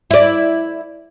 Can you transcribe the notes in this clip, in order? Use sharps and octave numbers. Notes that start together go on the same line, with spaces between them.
E4 D5